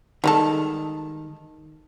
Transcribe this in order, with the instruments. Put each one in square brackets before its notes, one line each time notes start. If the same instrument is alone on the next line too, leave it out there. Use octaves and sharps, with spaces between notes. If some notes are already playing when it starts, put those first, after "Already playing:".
[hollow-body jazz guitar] D#3 [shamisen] G3 G#3 A4